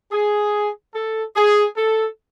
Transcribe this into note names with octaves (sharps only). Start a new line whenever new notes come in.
G#4
A4
G#4
A4